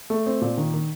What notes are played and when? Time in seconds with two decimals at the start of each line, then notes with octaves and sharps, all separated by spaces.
0.10 A3
0.26 C4
0.41 A#2
0.57 D#3
0.74 D#3